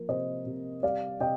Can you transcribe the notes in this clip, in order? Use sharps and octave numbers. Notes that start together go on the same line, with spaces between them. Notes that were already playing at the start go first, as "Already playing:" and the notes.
Already playing: F3 A#3 A#4
C3 C5 D#5
C3
G3 D5 F5
C3 D#5 G5